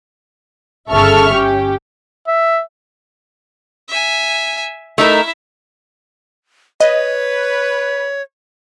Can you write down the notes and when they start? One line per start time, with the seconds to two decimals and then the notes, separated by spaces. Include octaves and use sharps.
0.91 G1 C#3 A4 E5 C#6 F6
1.34 C#4 G4
2.28 E5
3.89 E5 G#5
4.98 A3 D#4 E4 A#4 E5
6.81 B4 C#5 D#5